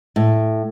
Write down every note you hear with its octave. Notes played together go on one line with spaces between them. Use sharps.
A2